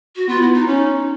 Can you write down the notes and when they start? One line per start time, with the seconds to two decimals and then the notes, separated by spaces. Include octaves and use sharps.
0.16 F#4
0.27 B3 F4
0.41 E4
0.54 D#4
0.67 C#4 D#4